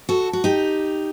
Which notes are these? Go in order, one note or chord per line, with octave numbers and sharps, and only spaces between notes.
F#4 A4
F#4
D#4 G4